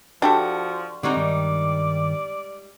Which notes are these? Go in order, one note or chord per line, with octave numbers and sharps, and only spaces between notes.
F3 D4 F#4 G4 A4
D3 G3 G#3 C4 D#4 F#4
G2 D#3 A#4 D5